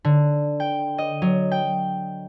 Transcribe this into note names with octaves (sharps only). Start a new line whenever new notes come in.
D3
G5
D#5
F#3
G5